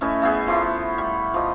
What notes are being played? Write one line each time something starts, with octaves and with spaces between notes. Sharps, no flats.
A3 C#4 E4 D#5
A3 B3 G#4
F3 A3 E4
G3
F3 D#5